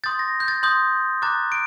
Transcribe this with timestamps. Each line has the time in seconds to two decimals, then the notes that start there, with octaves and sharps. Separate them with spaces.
0.04 C6 D#6 G6 A6
0.19 A#6
0.40 G6
0.48 A6
0.63 C6 D#6 G6
1.22 A#5 D6 F#6 A6
1.52 D7